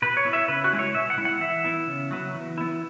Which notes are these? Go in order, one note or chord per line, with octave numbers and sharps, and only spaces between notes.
B2 B4
C#5
B3 E4
E5
C#3 B4
F#4
G#3 E4
C#5
B2 E5
F#5
G#3 E4
F#5
E3 E5
B3 E4
C#3
F#3 B3
E3
B3 E4